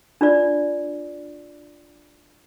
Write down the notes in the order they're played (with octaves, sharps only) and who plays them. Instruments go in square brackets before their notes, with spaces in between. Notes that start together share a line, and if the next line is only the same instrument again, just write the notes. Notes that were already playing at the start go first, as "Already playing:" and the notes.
[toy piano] D4 F4 D5